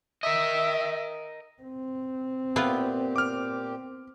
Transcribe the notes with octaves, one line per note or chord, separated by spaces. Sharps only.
A#4 D#5 E5
C4
A#2 B3 E4 F4 G4
D6 F6